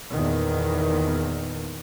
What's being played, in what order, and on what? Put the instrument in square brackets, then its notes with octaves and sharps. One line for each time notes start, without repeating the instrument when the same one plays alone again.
[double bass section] E2 A#2 D#3